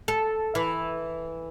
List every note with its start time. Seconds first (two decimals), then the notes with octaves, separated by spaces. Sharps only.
0.08 A4
0.55 E3